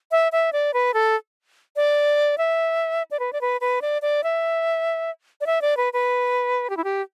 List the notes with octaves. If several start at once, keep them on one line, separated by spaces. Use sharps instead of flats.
E5
E5
D5
B4
A4
D5
E5
D5
B4
D5
B4
B4
D5
D5
E5
D5
E5
D5
B4
B4
G4
E4
G4